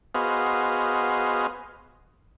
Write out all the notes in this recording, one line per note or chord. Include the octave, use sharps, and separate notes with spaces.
B3 F#4 G#4 C5 D#5 F5